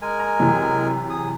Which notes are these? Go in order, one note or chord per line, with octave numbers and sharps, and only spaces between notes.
G#3 A#4 G#5
A#5
F#2 C3 E3
G#4 D#6